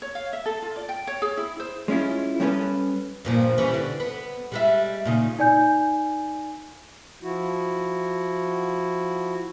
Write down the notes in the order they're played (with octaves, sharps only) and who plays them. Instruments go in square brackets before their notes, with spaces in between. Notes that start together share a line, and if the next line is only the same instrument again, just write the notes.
[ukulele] C#5
F5
E5
A4
F4
D5
G5
C#5
G#4
E4
C5
[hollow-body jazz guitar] G#3 C#4 E4 F4
G3 B3 C#4 E4 A4 B4
[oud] G2 A#2 F3
E3 G3 C#4
D3
B3
G3 G#3 E5
A#2 C#3 D#4
[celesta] D#4 D5 G#5 G6
[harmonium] F3 E4 F#4